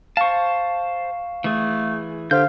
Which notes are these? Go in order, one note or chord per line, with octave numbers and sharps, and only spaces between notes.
C5 F5 A5 C#6
E3 A3 G#4
D3 G4 C5 F5 G6